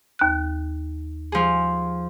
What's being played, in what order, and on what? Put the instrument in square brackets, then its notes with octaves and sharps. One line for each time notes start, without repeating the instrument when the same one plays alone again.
[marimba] D#2 F#6
[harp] F3 G#4